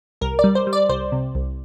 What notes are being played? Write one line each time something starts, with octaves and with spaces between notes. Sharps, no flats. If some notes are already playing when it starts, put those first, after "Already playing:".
C2 A#4
G3 D5
C5
G3
D5
C2 C5
C3
C2